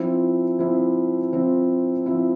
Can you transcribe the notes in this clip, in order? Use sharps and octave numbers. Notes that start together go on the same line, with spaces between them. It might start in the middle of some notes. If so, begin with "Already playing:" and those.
Already playing: F3 C4 E4
F3 C4 E4
F3 C4 E4
F3 C4 E4